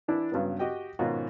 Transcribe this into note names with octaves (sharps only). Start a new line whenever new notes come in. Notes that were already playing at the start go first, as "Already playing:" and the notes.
E3 D4 E4
G2 C#3 F#3 B3
F#4 G4 D#5 G5
G#2 B2 D#3 C#4 F4 F#4